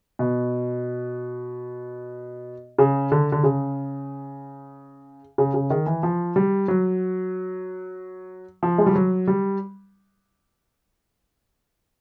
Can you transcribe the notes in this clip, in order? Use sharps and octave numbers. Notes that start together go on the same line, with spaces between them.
B2
C#3
D3
D3
C#3
C#3
C#3
D#3
E3
F3
G3
F#3
F3
G#3
G3
F#3
G3